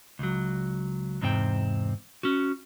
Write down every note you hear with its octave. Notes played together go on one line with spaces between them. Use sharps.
C#2 F#3
E2 G#2 C3 C4 G5
C#4 F#4